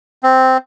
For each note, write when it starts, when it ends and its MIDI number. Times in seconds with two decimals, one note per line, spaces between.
0.23 0.57 60